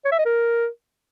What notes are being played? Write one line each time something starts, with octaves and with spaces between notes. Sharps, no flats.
C#5
E5
D#5
A#4